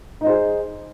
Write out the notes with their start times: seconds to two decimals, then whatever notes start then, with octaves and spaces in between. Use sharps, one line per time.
0.21 D#4
0.24 D#5
0.27 C5
0.29 G#4